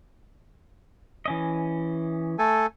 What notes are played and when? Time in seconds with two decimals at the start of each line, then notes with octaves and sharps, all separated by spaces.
1.26 E3 C#4 D#5
2.39 A3 A4 G#5